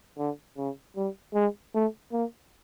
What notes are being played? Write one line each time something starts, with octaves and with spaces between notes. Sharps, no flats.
D3
C#3
G3
G#3
A3
A#3